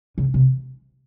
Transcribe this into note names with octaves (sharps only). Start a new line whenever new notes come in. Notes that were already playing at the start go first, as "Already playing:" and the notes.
C#3
C3